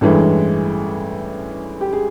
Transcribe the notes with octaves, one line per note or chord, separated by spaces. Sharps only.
A1 G2 E3 G#3 A4
G4
G#4